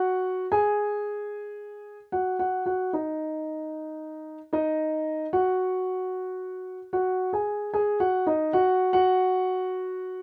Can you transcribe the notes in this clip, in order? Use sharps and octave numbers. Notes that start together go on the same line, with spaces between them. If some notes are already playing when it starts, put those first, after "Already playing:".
Already playing: F#4 F#5
G#4 G#5
F#4 F#5
F#4 F#5
F#4 F#5
D#4 D#5
D#4 D#5
F#4 F#5
F#4 F#5
G#4 G#5
G#4 G#5
F#4 F#5
D#4 D#5
F#4 F#5
F#4 F#5